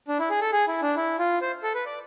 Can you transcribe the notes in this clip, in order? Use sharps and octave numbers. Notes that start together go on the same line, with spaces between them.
D4
E4
G#4
A4
G#4
E4
D4
E4
F4
C5
A4
B4
D5